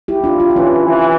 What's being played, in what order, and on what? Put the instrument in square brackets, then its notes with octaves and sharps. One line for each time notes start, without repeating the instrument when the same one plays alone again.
[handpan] E4 G4
D4 F4
D4 F4
F4
[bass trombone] E3 [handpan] C#4 E4
[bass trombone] E3